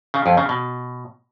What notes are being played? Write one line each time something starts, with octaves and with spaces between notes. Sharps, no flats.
C#3
F2
C#3
B2